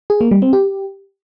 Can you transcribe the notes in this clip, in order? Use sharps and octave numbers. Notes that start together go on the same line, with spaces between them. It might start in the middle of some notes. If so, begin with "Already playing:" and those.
G#4
A#3
G3
C4
G4